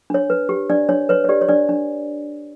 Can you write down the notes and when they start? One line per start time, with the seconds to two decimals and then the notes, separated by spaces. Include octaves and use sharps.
0.10 D4 C#5
0.30 B4
0.49 G4
0.70 D4 D5
0.89 D4 C#5
1.09 B4 C#5
1.24 C#5
1.29 G4 D5
1.41 C#5
1.49 D4 D5
1.69 D4